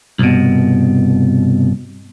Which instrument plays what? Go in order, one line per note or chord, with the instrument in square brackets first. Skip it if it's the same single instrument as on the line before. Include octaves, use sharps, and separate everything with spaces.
[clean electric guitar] C2 G2 B2